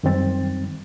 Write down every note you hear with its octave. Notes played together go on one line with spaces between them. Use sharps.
F#2 D#3 G3 C4 A6